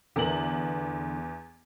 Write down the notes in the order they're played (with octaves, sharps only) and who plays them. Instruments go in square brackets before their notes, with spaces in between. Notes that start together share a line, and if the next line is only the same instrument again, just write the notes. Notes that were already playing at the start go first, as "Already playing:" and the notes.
[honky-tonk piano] E2 B3 F#7 [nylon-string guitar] D3 A#4